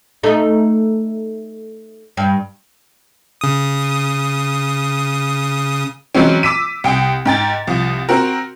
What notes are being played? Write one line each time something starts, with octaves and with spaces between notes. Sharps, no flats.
A3 D#4
G2
C#3 D#6
E3 F#3 G#3 C4 C#4
D6 E6 B6 D#7
C2 G5
G#2 G5 A6
C2 F3
C4 F#4 A#4